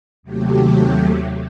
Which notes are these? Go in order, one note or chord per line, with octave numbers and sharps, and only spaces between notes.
D#2 C3 F#3 A3 G4